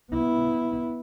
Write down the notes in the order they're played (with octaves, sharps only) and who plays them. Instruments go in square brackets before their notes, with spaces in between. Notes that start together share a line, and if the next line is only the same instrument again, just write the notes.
[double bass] B3 E4